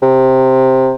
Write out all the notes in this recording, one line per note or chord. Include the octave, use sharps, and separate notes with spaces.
C3